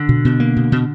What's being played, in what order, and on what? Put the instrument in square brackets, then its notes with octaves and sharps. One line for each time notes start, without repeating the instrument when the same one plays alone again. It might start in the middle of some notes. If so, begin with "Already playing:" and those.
Already playing: [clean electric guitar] D3
[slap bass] B2
B2
A#3
B2
B2